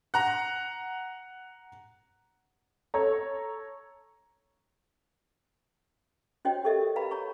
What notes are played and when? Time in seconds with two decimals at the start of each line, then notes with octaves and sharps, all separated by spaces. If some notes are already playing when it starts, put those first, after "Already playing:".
0.14 F#5 A#5
2.94 A4 C#5 A#5
6.45 C#4 F#4 C5 C#5 D#5 G5
6.65 G4 A4 A#4 D#5 E5
6.96 B4 F5 A#5 B5
7.11 C#5 A#5 C#6